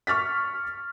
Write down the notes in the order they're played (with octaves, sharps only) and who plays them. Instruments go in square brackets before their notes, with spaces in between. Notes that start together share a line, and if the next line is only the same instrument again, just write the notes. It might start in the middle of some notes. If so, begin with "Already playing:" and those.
[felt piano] C#6 F6 A6 B6